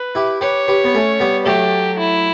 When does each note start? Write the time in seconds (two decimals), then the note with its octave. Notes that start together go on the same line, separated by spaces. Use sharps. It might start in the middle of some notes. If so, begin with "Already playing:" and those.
Already playing: B4
0.15 E4 G4
0.41 G4 B4 C#5
0.68 G4 B4
0.84 B3
0.94 A3 C#4
1.20 G3 B3
1.46 F#3 A3 G4
1.99 E4